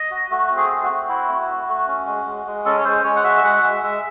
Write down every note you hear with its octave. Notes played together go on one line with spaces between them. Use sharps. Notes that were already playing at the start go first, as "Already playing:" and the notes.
Already playing: D#5
F#4
A3 F#4
C4
G#4
A3
F#4
C4
E4
A3
A3
A3
C#4
G#3
G#3
G#3
C#4 A4
C#5
G#3 C5
G#3 C#5
F#5
F#4 E5
E5
G#3 F#5
G#3 E5
G#3 E5